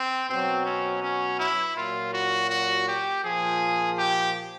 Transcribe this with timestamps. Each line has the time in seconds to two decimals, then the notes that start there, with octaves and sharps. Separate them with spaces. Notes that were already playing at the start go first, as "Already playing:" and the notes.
Already playing: C4
0.30 B2 F#3 C4
0.66 C#4
1.03 C#4
1.40 E4
1.77 A#2 F#3 F4
2.14 F#4
2.50 F#4
2.87 G4
3.25 A#2 F3 G#4
3.98 G4